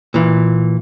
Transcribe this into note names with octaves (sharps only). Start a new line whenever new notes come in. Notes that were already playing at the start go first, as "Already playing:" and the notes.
A#2 E3